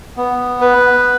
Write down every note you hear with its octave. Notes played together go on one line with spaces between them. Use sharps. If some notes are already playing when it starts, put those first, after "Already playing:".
B3
B4